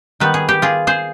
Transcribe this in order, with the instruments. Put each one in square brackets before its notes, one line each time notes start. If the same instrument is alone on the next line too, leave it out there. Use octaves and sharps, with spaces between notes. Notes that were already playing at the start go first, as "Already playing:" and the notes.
[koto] D#3 G3 B3 B4
G#4
G4
F4 G#4
G#4 C5